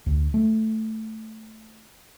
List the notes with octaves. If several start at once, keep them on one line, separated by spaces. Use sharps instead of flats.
D2
A3